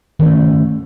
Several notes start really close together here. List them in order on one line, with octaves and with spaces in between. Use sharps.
D#3 C#4 A3